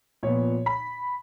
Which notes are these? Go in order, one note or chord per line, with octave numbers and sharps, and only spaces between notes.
A#2 F3 B3 C#5
B5